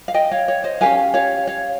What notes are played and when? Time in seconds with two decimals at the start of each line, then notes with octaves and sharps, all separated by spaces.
0.08 F5
0.14 D#5 G5
0.31 C#5 F5
0.48 C#5
0.64 C5 D#5
0.81 C#4 G4 A#4 F5 G#5
1.14 C#5 F5
1.47 C#5 F5